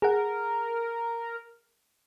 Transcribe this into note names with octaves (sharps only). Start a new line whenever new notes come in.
G#4 A#4 F#5